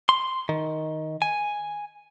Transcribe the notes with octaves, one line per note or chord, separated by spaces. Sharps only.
C6
D#3
G#5